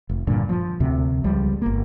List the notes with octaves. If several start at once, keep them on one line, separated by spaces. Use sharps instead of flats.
F1
G2 A#2 D3
F3
D2 C3
C#2 F3 G3
G1 A#3